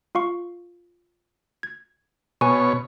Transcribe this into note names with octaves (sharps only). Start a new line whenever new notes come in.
F4 F5 C#6
G#6
B2 B4 C#5 G#5 C#6